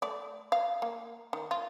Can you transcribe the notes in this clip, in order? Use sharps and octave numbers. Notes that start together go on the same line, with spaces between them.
A3 D5
F5
A#3
D#3
F4